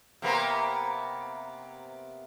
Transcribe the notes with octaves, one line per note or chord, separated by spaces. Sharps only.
C3 A#3 B3